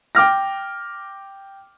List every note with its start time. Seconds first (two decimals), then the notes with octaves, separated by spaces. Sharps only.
0.15 G5 D6 F6 A#6